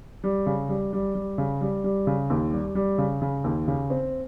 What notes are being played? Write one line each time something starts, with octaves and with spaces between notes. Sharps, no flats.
G3
C#3
G3
G3
G3
C#3
G3
G3
C#3
D#2
G3
G3
C#3
C#3
D#2
C#3
C4